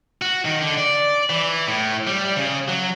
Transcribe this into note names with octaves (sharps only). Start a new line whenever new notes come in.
F#4
D#3
D3
D5
E3
A2
G3
C#3
F#3